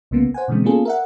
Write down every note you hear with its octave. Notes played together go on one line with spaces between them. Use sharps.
C2 C#3 A#3 B3
C5 F#5 G#5
B2 D3 E3 G#3 C4
A#3 B3 C#4 F4 G#4 A4
A#4 E5 F#5